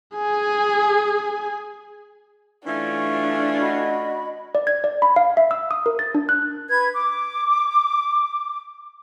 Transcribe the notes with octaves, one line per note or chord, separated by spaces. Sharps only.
G#4 G#5
E3 A3 C#4 D4 F4
F#4 D#5 B5
D5
G#6
D5
B5
F5
E5
E6
D#6
A#4
A6
D4
F#6
B4 G#6
D6